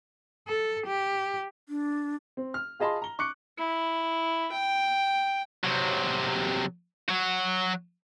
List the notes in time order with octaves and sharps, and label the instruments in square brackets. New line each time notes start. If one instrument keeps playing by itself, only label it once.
[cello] A4
G4
[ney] D4
[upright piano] C4
F6
F4 G#4 D#5 A5 B5 C6
A#5 G7
C#6 D6 F#6 C#7
[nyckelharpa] E4
G5
[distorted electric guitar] C3 F#3
F#3 F#4